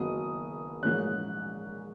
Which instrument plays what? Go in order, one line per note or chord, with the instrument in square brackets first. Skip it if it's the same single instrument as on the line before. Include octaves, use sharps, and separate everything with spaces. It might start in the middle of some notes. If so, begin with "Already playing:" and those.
Already playing: [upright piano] F#1 F#2 D#3 F#3 B3 D#6
A#1 G#2 E3 A#3 C#4 F#6